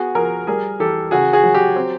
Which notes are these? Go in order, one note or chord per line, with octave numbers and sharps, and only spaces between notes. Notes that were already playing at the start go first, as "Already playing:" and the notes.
Already playing: B3 F#4 G#4
F3 G#4 A#4
G3 G#4 A#4
E3 G4 A4
C#3 F#4 G#4
F#4 G#4
F#3
G4
C4